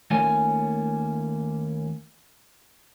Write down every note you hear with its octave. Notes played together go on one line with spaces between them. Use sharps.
D#2 A3 A#3 C#4 F4 G#5